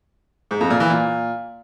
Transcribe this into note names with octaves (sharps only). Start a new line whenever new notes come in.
G#2
F2
A#2
E3
A#2